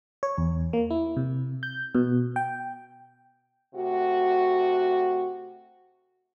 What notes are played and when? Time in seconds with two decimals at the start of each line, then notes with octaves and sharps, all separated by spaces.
0.23 C#5
0.38 E2
0.73 A#3
0.90 E4
1.17 C3
1.63 G6
1.95 B2
2.36 G5
3.75 C3 A3 F#4